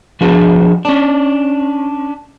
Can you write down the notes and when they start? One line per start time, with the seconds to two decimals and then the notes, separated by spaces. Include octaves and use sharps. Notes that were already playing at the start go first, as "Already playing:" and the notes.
0.21 F3 D4 F#4 G#4
0.85 C#4 D4